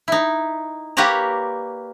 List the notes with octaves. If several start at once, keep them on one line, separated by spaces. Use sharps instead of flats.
D#4 E4
A#3 G4 B4 C#5 D5 A#5